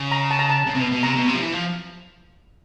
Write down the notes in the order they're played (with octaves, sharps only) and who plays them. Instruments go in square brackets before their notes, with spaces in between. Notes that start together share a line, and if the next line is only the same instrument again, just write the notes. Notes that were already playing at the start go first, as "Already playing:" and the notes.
Already playing: [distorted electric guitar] C#3
[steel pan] A#5
A5
A#5
A5
[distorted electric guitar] C#3
C3
B2
B2
[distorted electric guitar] C3 [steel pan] A#5
[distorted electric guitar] B2
C3
F3
E3
F3